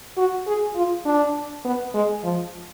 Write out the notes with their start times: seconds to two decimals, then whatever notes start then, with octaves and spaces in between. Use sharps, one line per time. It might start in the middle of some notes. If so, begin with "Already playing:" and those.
0.17 F#4
0.47 G#4
0.76 F4
1.05 D4
1.65 B3
1.94 G#3
2.24 F3